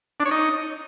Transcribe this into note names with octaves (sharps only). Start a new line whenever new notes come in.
D4
C#5
D#4